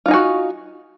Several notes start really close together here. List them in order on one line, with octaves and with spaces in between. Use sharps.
F4 D#4 G#5 F#4